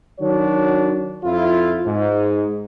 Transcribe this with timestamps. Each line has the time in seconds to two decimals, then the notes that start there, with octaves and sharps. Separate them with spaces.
0.19 D#3 F#3 D4 F#4 C#5
1.24 F2 E4 F4
1.87 G#2